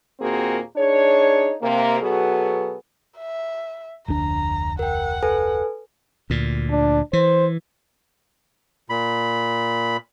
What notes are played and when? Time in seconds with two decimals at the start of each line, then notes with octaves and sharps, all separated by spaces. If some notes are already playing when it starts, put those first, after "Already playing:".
0.20 D#2 A#2 A#3 C4 F#4 G#4
0.76 D4 D#4 G#4 C#5
1.61 C3 A#3
2.00 B2 F#3 B3 G#4 A4
3.18 E5
4.08 F1 D2 D4 A#5
4.79 A#4 F#5 G5
5.23 A4 B4 G#5
6.30 D2 A#2
6.71 D4
7.13 E3 C5
8.90 A#2 B5